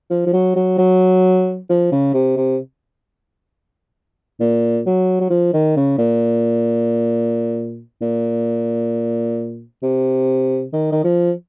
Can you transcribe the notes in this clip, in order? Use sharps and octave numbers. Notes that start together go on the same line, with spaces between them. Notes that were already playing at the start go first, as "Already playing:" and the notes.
F3
F3
F#3
F#3
F#3
F3
C#3
C3
C3
A#2
F#3
F#3
F3
D#3
C#3
A#2
A#2
C3
D#3
D#3
F3